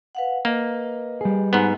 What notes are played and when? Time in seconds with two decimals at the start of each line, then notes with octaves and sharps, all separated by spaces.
0.15 B4 F5 F#5
0.45 A#3 B4 D#5
1.21 G3 G#4
1.53 G#2 B3